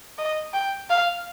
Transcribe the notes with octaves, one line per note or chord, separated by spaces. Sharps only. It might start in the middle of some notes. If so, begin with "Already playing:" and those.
D#5
G5
F5